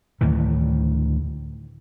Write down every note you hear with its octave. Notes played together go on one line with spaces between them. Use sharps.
D2 A2 D#3 E3